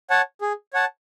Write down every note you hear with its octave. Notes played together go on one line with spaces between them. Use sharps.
C#5 F#5 A5
G#4
C#5 F#5 A5